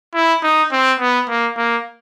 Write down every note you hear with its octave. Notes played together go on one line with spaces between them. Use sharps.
E4
D#4
C4
B3
A#3
A#3